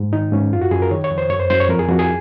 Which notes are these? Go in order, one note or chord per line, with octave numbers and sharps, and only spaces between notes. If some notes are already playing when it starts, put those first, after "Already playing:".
Already playing: G#2
D#3 D#4
G#2 C#4
F#2 F4
F#4
F#2 G#4
A#4
D#3 C#5
C#5
F2
C5
F#2 C#5
C5
F#2 C5
C#5
F2 A#4
G#4
F2 F#4
G#4